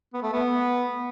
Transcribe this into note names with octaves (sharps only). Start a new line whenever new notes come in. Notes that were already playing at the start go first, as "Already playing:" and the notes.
B3
A3
B3